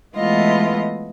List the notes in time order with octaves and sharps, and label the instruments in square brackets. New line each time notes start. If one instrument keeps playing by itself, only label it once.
[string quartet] E3 G#3 A3 B3 F4 D#5